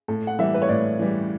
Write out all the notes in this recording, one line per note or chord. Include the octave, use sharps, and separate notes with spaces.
A2 A4
F#5
E3 G3 E5
B4
C#5
A2 D5
E3 G3